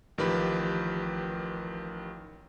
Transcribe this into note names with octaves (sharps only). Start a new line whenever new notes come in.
A1 D#3 F3 G4 B4 B5